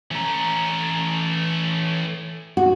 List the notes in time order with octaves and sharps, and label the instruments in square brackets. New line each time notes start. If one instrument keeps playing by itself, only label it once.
[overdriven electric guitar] E3 A#5 [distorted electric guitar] A3 C#4
[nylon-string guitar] F#4